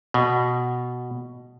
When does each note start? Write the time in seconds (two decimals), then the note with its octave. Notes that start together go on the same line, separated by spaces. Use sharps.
0.14 B2